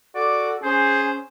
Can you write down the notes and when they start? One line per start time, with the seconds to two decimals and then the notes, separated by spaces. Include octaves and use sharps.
0.15 F#4 A4 D5 D6
0.63 C#4 G#4 C5